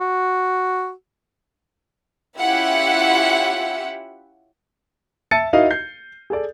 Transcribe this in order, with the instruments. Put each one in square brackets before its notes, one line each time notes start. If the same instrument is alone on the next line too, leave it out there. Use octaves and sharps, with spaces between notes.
[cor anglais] F#4
[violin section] C#4 E4 F4 G4 E5 F#5
[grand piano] E5 A5 E6 A6 C#7 D#7
D#4 E4 F#4 A#4 D#5 F5
G6 C7
G#4 A4 D5